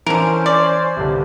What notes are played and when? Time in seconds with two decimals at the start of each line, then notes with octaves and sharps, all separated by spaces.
0.06 D3 E3 C#4 A#4 C5
0.46 D5
0.97 C2 G2 D3